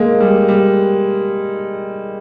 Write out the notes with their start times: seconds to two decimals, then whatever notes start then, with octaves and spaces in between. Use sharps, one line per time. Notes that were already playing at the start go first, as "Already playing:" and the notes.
Already playing: G#3 A#3
0.20 G3
0.48 G3